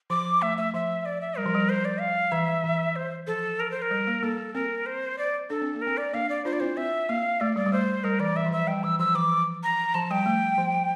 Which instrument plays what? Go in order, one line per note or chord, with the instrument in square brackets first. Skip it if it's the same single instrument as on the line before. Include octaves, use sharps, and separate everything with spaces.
[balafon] F3 [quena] D6
[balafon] A3 [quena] E5
[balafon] A3 [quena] E5
[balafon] F3 [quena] E5
[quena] D5
E5
[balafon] G3 [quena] A#4
[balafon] F3
G3
[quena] C5
D5
F5
[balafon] E3 [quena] E5
[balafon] E3
[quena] C5
[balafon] F3 [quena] A4
[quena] A#4
C5
A#4
[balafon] G3
A#3
[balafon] A#3 [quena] A4
[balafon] C4 [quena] A#4
[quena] C5
D5
[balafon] D4 [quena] A4
[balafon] C4
A#3
[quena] A#4
[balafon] C4
[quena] D5
[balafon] A#3 D4 [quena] F5
[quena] D5
[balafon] D4 F4 [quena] C5
[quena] D5
[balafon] C4 E4 [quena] C5
[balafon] C4 [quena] E5
[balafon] A#3 [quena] F5
[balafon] A3 [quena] D5
[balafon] G3 [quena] D5
[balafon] G3
[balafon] A3 [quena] C5
[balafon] G3 [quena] A#4
[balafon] E3 [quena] D5
[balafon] E3 [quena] E5
[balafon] F3
[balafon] E3 [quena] E5
[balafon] G3 [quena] G5
[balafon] E3 [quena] E6
[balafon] F3 [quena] E6
[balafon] E3 [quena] D6
[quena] A#5
[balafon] F3 [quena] A5
[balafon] G3 [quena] G5
[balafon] A3
F3